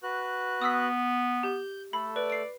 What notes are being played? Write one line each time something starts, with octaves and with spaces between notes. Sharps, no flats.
F#4 B4 F#6
B3 D#6 E6 B6
G4 G6
A3 A4 B5
B4 D5
C7 D7